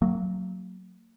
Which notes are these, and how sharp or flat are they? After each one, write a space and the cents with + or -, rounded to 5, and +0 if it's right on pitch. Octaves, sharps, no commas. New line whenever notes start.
F#3 -5 A#3 -35